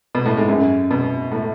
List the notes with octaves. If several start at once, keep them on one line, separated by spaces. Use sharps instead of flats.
B2
A2
G#2
F#2
B2
A2